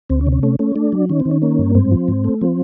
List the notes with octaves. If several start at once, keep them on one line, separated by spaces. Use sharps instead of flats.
D2 C4
C#4
C3
C#4
A3 C#4
A3 C#4
A3 D4
F#3
D#3 C#4
C4
D#3
C#4
A#3 C#4
G2
G#2 C4
F3
G#2
A3
F3 C4